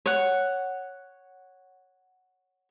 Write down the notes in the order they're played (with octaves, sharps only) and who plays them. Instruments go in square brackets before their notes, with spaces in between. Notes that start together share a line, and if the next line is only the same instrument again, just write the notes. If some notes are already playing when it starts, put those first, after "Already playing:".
[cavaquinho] C#5 F#5